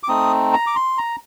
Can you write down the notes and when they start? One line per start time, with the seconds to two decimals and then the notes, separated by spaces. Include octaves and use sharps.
0.03 D6
0.08 A3 C4 D#4 D#6
0.53 A#5
0.67 D6
0.76 C6
0.98 A#5